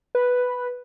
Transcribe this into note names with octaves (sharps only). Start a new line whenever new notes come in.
B4